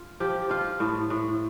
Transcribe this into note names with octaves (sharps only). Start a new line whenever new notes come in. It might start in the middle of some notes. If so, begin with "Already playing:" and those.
Already playing: F4
F3 G4
F3 F4
A2
A2